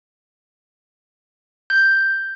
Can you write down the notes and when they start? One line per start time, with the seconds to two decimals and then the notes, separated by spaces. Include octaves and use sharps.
1.70 G6